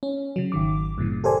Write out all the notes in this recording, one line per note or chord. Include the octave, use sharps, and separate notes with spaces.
C#4
C#3 F#3
G#1 D#3 D6
G2 A#2 C#3 E3
G4 A4 A#4 C5 D5 G#5